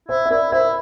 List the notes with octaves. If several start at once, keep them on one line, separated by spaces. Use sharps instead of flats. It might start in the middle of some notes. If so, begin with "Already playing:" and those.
E4 C5 E5
E5
E4 A#4 D5
E4 C5 E5